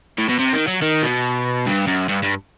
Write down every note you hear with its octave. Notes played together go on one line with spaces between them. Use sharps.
A2
B2
C3
D#3
F#3
D#3
B2
G2
F#2
G2
G2